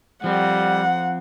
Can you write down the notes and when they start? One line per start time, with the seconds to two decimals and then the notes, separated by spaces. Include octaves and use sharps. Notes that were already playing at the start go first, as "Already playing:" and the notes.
0.24 F3 G3 C4 F#5